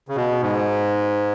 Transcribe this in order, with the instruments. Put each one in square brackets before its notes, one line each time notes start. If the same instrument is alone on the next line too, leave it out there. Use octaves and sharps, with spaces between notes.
[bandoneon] C#3
B2
G#2